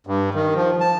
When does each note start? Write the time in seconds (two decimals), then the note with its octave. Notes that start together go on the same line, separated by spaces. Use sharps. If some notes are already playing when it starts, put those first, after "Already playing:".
0.07 G2
0.34 D#3
0.55 F3
0.80 A5